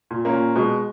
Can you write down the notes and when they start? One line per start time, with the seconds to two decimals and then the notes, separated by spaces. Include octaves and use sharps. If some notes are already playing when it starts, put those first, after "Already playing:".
0.11 A#2
0.25 A#3 C#4
0.32 A#2
0.56 B2 G#3